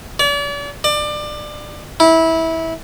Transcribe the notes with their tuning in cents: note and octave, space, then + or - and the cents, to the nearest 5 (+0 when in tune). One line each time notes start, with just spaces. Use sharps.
D5 -40
D5 +25
E4 -20